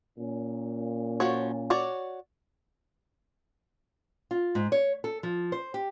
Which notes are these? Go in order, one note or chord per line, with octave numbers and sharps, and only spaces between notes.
A#2 C#4
F3 F#4 C#5
F#4 C#5 D5
F4
G#2
C#5
A4
F3
C5
G4